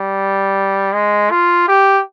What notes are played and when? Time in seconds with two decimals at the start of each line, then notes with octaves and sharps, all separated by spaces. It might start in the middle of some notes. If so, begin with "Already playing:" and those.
Already playing: G3
0.94 G#3
1.31 F4
1.68 G4